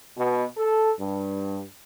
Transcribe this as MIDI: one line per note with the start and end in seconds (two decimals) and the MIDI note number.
0.17 0.44 47
0.57 0.91 69
0.99 1.63 43